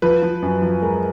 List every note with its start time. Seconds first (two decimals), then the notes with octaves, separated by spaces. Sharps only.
0.02 F3 B4
0.23 F3
0.42 F#2
0.62 F3
0.82 G#3 A#4